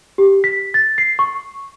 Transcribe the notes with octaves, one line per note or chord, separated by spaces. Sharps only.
G4
B6
A6
C7
C#6